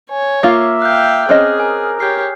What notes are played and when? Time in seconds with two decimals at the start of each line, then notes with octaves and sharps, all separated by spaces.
0.11 C#5 G#5
0.43 A#3 F4 E5 A#5 D6 F6
0.82 F5 G5 F#6 G6
1.29 C4 C#4 G#4 D#5 D#6 F6 F#6
1.60 A#4 G#5
2.00 G4 C#5 G6 C7